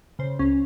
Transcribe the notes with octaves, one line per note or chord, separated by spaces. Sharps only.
C#3 C5
C#2 C#4